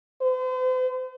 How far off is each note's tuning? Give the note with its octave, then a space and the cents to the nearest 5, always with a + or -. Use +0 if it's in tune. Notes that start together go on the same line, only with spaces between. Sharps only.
C5 -40